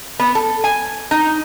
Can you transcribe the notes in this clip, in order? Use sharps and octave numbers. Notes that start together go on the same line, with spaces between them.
B3
A4
G#5
D#4